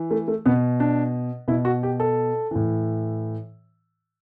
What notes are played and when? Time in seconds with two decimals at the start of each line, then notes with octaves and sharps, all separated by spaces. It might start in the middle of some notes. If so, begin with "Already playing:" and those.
Already playing: E3
0.11 A3
0.28 A3
0.46 B2 B3
0.80 D4
1.48 B2 E4
1.65 F#4
1.83 G4
2.00 A4
2.51 A2 E3